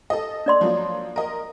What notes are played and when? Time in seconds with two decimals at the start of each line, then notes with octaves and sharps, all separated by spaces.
0.10 A4 D#5
0.46 D4 D5 C6
0.61 F3 F#3 A#3
1.16 A#4 D#5